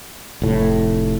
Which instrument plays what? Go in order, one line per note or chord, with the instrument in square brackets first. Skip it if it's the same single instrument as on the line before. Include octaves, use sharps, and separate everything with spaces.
[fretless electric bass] F1 A2